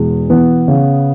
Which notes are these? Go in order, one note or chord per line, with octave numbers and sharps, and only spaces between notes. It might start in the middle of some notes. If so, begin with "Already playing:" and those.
Already playing: E2 B2 G#3
E3 B3
C#3